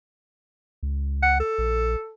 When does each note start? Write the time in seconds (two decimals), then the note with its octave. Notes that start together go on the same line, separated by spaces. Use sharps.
0.83 C#2
1.23 F#5
1.40 A4
1.58 A#1